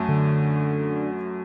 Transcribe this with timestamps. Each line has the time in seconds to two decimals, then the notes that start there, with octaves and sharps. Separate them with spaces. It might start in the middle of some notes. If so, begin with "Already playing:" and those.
Already playing: F#2 F#3 A3
0.09 D3